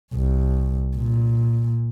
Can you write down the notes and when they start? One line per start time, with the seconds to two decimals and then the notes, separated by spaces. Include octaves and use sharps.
0.13 C2
0.97 A#2